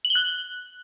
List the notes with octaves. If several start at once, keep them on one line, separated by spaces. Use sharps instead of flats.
F#7
G7
F#6